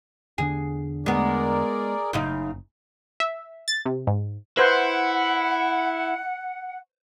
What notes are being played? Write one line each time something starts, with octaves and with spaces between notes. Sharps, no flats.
E2 D3 D4 G#4
G#3 B3 G#4 A#4 D5
F#1 F#2 C#3 D#4
E5
A6
C3
G#2
E4 B4 C5 F#5